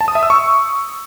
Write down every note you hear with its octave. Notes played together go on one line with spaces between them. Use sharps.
A5
D#6
E5
E6
C#6